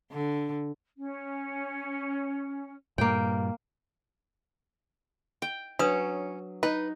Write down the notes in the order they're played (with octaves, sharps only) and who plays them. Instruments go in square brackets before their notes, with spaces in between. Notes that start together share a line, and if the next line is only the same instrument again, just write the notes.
[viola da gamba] D3
[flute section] C#4
[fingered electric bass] G2 A#2 G3 [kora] A#3 G5
[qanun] G5
[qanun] F#3 [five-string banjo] C#4 [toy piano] D4 B4 D#6
[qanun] D#4 [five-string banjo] B4